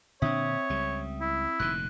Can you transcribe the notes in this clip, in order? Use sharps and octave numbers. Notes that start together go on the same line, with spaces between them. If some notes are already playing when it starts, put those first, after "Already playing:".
A#2 D3 C4 D4 C#5 E5 D#6
C#2 G3
E4
F1 A#2 D#3 F#6